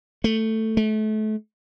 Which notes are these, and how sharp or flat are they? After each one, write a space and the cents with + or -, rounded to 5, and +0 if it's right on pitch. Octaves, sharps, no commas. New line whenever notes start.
A3 +10
A3 -30